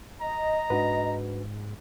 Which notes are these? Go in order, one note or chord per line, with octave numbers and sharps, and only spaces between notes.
D#5 A#5
G#2 D4 F#4 B4